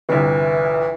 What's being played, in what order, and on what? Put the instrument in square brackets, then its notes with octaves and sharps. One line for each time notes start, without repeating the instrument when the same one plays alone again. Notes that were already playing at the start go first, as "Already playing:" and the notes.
[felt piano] G1 C2 [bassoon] E3